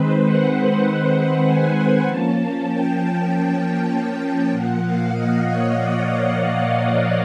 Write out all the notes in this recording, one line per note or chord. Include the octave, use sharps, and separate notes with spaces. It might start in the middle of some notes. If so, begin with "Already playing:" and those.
Already playing: D#3 G#3 C4 B4 C5
F#5
G#5
F3 A#3 C#4 A5
G5
A#2 F3 A#3 F#5
F5
D#5
C#5
D5
C#5